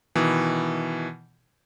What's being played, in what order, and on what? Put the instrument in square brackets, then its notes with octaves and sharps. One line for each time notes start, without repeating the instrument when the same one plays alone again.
[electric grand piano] B2 D#3 E3